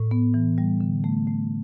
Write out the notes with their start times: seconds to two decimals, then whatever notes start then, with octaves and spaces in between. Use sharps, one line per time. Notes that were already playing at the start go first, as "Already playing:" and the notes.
Already playing: A2
0.11 B3
0.34 E3
0.58 G3
0.81 D3
1.04 A3
1.27 A3